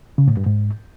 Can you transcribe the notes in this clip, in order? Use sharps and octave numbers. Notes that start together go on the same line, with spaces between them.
C#3
A2
G2
G#2